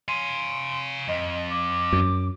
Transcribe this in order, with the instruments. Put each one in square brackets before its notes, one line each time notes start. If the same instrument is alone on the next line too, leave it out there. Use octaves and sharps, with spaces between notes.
[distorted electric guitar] F5 G#5 [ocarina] C6
[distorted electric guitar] F2 [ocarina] D#5
[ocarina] D6
[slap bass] F#2